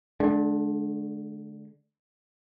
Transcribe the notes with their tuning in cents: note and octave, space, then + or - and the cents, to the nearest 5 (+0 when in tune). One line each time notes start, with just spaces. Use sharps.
D3 +0 G#3 +45 D4 +0